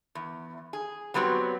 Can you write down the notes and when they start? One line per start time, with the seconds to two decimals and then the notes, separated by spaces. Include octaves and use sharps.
0.15 E2
0.73 G#4
1.14 F#3 G3 B3 C4 F#4